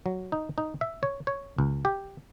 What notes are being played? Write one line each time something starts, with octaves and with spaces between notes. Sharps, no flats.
F#3
D#4
D#4
E5
C#5
C#5
C#2
G4